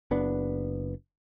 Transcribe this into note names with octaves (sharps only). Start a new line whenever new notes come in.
F#1 B3 D4